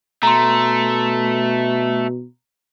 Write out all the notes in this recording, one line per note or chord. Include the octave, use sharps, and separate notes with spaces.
B2 A3 A#5 C6